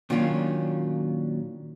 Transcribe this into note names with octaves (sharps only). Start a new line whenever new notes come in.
A#2 D#3 F#3 C#4 D4 F4